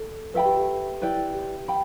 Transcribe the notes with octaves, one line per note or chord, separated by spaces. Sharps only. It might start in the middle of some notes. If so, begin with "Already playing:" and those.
Already playing: A4
A4 B4 E5 G5 B5
G4
G4
E4 B4 D5 G5
G4
G5 B5